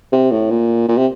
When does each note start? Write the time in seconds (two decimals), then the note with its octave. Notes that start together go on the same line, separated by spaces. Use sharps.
0.13 C3
0.31 A2
0.51 A#2
0.89 A#2
0.98 C3